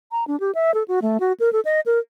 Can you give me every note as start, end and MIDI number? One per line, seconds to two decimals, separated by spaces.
0.12 0.24 82
0.28 0.39 62
0.40 0.51 67
0.55 0.74 76
0.74 0.83 69
0.88 1.00 66
1.02 1.18 57
1.20 1.33 66
1.40 1.52 70
1.53 1.60 69
1.65 1.80 75
1.86 1.99 70